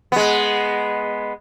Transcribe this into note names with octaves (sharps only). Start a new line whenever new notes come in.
G#3 B3